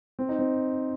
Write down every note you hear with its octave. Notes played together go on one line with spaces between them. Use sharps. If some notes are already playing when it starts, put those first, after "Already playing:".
C4
D#4
C4